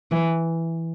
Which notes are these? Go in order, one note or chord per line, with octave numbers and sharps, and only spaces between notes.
E3